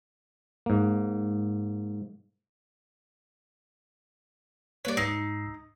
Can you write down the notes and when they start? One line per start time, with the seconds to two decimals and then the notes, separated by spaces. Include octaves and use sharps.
0.66 G#2 A#3
4.85 G3 A#3 B4 C#5 D5
4.97 G#2 D#4 E6 C7